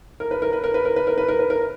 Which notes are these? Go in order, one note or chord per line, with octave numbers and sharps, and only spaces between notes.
A#4
B4
A#4
B4
A#4
B4
A#4
B4
A#4
B4
A#4
B4
A#4